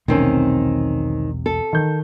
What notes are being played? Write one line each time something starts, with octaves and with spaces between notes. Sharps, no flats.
E1 B1 C3 D#3 A3 C4 C#4
A4
D#3 G6